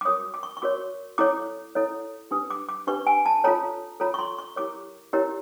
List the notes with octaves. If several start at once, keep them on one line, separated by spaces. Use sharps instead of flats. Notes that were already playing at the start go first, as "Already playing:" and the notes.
D6
F#4 A#4 C#5 D#6
D6
C#6
C#6
F#4 A#4 C#5 D6
E4 A4 C#5 D6
E4 A4 C#5
D4 G4 B4 D#6
D6
D6
D4 G4 B4 C#6
G#5
A5
F4 A4 C#5 A#5
F4 A4 C#5 A#5
C#6
C6
C#6
E4 G4 A#4 C#5 D6
E4 G4 A#4 C#5